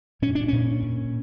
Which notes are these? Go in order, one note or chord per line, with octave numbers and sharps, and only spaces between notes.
A#2 C#4
D4
A#2 C#4
A#2